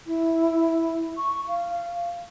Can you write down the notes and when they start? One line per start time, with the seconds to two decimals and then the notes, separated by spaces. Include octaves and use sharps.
0.07 E4
1.17 C#6
1.48 F5